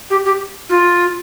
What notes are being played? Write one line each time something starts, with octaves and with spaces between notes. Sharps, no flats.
G4
G4
F4